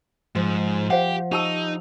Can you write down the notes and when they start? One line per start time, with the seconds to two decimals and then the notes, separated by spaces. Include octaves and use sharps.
0.35 G#2 F3
0.90 G4 C5 F5 F#5
1.32 D#4 G4 A5 E6